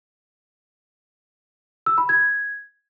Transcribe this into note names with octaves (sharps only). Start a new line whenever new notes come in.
E6
B5
G#6